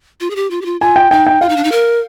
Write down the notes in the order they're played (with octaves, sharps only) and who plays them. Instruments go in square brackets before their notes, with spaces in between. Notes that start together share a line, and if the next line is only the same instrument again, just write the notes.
[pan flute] F4
G#4
G4
F4
G4
F4
[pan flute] F4 [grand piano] G#5
[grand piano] G5
[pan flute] D#4 [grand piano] G5
[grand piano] G5
[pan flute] F4 [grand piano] F5
[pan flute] D#4
D4
D#4
A#4